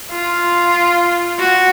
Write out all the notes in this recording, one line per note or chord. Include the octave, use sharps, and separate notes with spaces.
F4
F#4